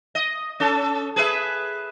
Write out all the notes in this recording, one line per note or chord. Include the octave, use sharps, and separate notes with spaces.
D#5
C#4 A4
G#4 B4 E5